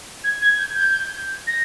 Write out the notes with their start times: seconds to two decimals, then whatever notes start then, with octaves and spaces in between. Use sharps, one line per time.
0.24 G#6
0.42 G#6
0.58 G6
0.75 G6
1.47 A#6